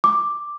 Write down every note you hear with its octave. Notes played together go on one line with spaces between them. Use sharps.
D6